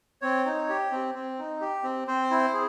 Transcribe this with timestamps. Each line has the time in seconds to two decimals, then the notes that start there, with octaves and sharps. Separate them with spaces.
0.22 C4 C#5
0.45 D#4
0.69 G4
0.91 C4
1.15 C4
1.38 D#4
1.61 G4
1.84 C4
2.08 C4 C5
2.30 E4
2.53 G#4